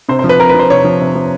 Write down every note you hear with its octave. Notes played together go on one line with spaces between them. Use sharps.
C3 C5
C5
F3
B4
C3 A#4
B4
F3
C5
C3 C#5
F3
C3
F3